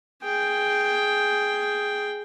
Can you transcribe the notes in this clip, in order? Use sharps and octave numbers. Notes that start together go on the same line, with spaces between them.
G#4 G5